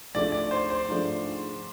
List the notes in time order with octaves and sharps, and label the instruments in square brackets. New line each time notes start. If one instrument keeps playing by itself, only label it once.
[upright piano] G#2 F3 A3 D4 [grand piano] D5
[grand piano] D5
C5
C5
[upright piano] G#2 F3 A3 D4